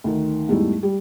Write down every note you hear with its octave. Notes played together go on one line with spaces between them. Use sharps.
D2 D#3
E2 G#2 G3 A3 E4
G3